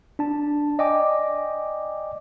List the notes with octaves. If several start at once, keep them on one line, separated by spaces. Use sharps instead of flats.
D4 A5
D5 D#5 G5 G#5 D6